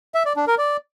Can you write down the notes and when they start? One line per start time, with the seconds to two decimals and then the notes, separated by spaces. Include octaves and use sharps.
0.15 E5
0.25 D5
0.36 D4
0.47 A#4
0.58 D5